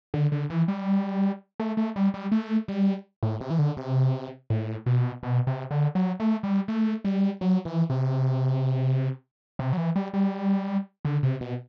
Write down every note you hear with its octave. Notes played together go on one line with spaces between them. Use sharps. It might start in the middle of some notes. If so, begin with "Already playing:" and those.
D3
D3
E3
G3
A3
A3
G3
G3
A3
G3
A2
C3
E3
D3
C3
A2
B2
B2
C3
D3
F#3
A3
G3
A3
G3
F#3
E3
C3
C3
F#3
E3
G3
G3
D3
C3
B2